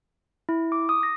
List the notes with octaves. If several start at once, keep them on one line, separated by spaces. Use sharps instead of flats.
E4
D6
D#6
A#6